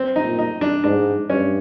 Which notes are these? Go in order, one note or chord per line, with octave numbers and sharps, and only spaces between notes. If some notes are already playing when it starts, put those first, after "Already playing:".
Already playing: C4
D#4
A#2
D#4
D4
G#2 D4
G2 C#4